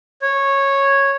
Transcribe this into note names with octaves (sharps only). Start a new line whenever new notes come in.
C#5